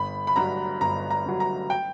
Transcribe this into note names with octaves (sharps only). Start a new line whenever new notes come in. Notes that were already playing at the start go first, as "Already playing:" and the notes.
Already playing: G1 B5
B5
G2 F#3 A#5
G1 A#5
A#5
G2 F#3
A#5
G5